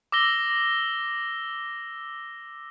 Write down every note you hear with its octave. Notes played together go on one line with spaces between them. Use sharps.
D6 E6 A#6 G7